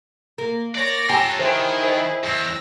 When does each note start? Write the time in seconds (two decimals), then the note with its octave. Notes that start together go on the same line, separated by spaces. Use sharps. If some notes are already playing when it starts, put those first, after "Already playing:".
0.38 A#3
0.75 C#5 D5 A#6
1.09 F4 G4 A4 G#5 A#5 C6
1.39 D#3 E4 G#4 C5 E5 C6
1.82 A#4 C5 D#5
2.24 E2 E6 A#6